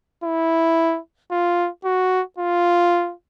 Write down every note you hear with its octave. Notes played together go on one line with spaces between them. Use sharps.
E4
F4
F#4
F4